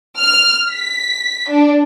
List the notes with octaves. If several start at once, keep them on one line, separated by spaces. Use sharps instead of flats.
F6
B6
D4